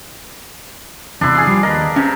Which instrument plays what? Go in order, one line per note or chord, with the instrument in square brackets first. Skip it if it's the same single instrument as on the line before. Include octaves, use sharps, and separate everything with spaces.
[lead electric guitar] E2 C3 [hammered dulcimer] D4 E4
[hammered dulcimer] G#4 F5
[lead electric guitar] F3 G3
[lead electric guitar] D#2 D#5 [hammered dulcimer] A#4 B4
[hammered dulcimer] C3 [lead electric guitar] C#4